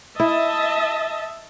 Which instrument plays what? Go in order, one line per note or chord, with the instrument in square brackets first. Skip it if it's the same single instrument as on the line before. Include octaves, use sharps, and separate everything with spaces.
[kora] E4 [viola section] D#5 E5 A5